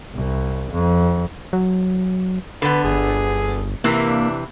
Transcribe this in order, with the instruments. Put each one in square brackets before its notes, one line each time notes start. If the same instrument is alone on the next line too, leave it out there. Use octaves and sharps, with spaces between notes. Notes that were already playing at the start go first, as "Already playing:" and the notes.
[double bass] C2
F2
[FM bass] F#3
[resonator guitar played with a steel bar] D3 B3 [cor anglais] B4
[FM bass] G1 [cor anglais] G#4
[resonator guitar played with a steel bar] C3 E3 [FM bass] A#3
[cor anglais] D4